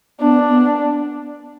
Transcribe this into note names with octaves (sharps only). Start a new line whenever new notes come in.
B3 D4
B3